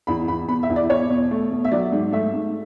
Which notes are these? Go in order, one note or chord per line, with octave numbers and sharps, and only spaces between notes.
E2 B5
E2 B5
B2 B5
E5
E2
D5
B2 C#5
B2
A3
B2
E5
F#3 D5
G#2
A3 E5
G#2